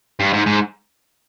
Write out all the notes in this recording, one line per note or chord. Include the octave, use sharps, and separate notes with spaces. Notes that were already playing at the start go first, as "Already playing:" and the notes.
G2
G#2
G#2